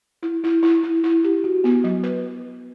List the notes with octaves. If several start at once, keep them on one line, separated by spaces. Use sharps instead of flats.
E4
E4
E4
E4
E4
G4
F#4
B3
F#3
B4